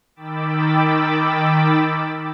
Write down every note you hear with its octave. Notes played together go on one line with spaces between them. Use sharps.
D#3 G5 B5 D6 E6 A6